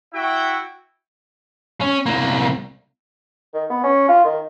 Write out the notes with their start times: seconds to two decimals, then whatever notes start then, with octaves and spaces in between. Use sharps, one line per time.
0.14 E4 F#4 E5 G5
1.81 C#4
2.06 C2 A#3
3.54 D#3
3.70 B3
3.84 C#4
4.09 F4
4.25 D#3